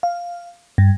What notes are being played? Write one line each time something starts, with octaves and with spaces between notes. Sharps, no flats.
F5
G2